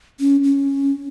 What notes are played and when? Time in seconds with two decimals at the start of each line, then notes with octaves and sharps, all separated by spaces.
0.20 C#4
0.43 C#4